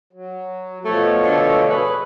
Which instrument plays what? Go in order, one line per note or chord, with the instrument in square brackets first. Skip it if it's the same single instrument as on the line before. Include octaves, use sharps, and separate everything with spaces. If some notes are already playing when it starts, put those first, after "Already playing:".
[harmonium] F#3
[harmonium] B2 F3 C#5 [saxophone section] A3
[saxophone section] D3 A3
G#4 B4